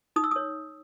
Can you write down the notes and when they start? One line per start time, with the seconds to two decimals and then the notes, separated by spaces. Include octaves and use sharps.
0.16 D#4 D#6
0.24 E6
0.31 D#6
0.36 C#5